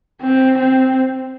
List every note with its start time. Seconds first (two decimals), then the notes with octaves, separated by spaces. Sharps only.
0.22 C4
0.59 C4